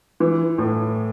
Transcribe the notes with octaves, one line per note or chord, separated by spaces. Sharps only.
E3
A2